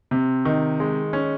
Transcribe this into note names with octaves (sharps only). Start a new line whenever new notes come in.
C3
D#3
G#3
C#4